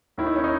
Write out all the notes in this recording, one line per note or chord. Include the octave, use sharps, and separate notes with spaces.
D#2 D#3 E4
D#4
C#4
D#4